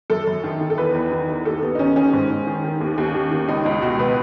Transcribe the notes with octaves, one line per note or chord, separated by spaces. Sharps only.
F#2 A4
F#2
D#3
D#3
A4
E2 B4
E2
D#3
D#3
D#2 A4
D#2 B3
D#4
D#3 C#4
D#3 C#4
G#2
G#2
D#3
D#3
D#2
D#2
D#3
D#3
C#2 D#4
C#2 D#4
B2 F#4
B2 B4